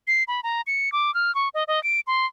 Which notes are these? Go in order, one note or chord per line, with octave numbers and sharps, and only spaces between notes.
C7
B5
A#5
C#7
D6
F6
C#6
D#5
D#5
D7
C6